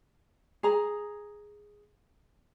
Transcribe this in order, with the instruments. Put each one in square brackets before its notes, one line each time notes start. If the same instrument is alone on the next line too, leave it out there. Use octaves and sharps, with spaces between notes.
[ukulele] G#4 A#5